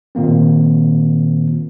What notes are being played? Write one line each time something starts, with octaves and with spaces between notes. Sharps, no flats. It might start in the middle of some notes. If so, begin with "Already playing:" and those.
A#2 D#3 A#3 C4